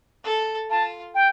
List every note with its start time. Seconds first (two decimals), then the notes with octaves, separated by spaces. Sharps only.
0.24 A4
0.70 F4 A5
1.15 G5